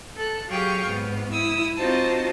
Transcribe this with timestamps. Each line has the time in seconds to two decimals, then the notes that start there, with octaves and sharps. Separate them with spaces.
0.16 A4 F#6
0.48 F#3 G4 G#4 F5 G5 C#6
0.85 G#2 B3
1.30 E4 D#6 E6
1.78 C4 D#4 F4 F#4 C5 A5